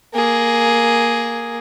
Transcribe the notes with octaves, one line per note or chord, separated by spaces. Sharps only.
A#3 G#4